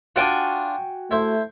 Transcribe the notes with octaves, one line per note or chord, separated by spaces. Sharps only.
D4 F4 F#4 G5 G#5
A3 E4 C5